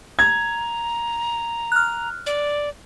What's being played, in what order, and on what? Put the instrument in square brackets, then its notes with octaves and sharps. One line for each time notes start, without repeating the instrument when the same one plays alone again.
[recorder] A#5 [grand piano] G#6
[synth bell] F6 F#6
[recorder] D5